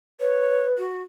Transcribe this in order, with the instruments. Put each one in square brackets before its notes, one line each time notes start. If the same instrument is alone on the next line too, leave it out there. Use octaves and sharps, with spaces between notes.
[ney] B4 [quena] C#5
[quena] F#4